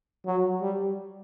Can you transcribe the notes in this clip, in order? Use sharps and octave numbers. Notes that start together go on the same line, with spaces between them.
F#3
G3